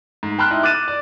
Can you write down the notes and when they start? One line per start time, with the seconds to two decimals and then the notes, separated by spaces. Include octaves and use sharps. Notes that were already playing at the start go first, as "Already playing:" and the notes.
0.23 G#2
0.38 G5 A5 B5 C6 F6 F#6
0.51 D#4 E4
0.63 D6 F#6 A6 D#7 E7
0.88 D5